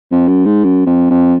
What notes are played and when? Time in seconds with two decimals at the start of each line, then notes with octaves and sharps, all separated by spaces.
0.12 F2
0.28 F#2
0.46 G#2
0.64 F#2
0.86 F2
1.10 F2